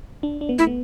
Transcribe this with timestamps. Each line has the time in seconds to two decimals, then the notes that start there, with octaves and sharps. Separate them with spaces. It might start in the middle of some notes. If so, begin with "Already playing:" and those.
0.23 D4
0.41 D4
0.49 B3
0.58 A3 E4
0.67 B3